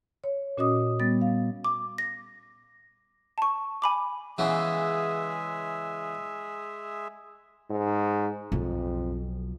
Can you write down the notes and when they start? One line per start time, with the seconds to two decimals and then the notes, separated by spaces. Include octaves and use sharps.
0.24 C#5
0.57 A#2 C#4 F#4 D#5 D6 D#6
1.00 G3 B3 A6
1.21 F5
1.65 D6
1.98 A#6
3.38 A5 C#6
3.82 G#5 B5 D6
4.38 C#3 E3 G#3 B3 G#4 E5
7.70 G#2
8.52 B1 F2